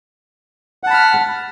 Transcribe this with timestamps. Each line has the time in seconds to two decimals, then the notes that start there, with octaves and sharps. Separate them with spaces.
0.83 F#5
0.87 A5
0.90 B5
0.94 F6